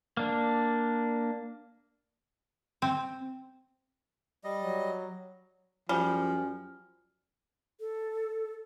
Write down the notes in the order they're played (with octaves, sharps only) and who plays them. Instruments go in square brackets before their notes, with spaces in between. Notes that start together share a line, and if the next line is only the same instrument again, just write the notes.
[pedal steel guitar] A#3 D4
[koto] C4
[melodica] G3 D#5
[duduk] F#3
[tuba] F#2 [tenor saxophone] F3 [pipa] G3 [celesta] G#5 F6
[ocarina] A4